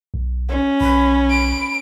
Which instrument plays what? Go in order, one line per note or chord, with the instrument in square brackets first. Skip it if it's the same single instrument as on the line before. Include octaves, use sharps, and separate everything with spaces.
[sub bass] B1
[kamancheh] C#4
[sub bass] B1 [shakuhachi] B5
[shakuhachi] B5 [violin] D7